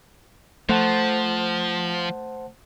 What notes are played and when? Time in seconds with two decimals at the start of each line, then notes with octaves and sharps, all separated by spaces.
0.69 F3 A3 C5 F#5 A5